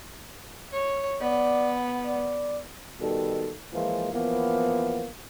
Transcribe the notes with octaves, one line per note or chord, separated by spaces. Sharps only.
C#5
B3 D5
D5
B2 D#3 G3 A4
E3 F3 G#3 A#3 F4
E3 F3 A#3 B3